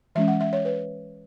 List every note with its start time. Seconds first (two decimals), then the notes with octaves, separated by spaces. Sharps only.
0.15 E3 G#3 C#4 E5
0.28 F#5
0.41 E5
0.53 C#5
0.65 B4